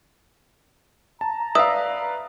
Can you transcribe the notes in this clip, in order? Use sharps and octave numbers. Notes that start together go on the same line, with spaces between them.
A5 A#5
B4 D5 E5 F5 D#6